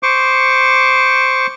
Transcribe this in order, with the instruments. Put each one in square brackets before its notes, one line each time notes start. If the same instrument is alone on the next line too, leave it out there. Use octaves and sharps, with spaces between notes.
[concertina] C5 C#6 D6